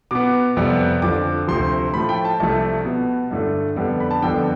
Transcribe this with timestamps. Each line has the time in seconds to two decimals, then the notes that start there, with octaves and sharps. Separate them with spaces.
0.11 B2 B3 D6
0.57 F2 C3 G3 B3
1.02 F2 D3 F3 D6
1.47 D2 C3 F3 C6
1.94 A2 F3 A3 B5
2.09 G5
2.25 A5
2.40 C2 C3 F3 A3 A5
2.85 B2 B3
3.31 G2 D3 A3
3.76 F2 D3 G3 B3
4.00 B5
4.11 A5
4.22 F2 D3 G3 B3 G5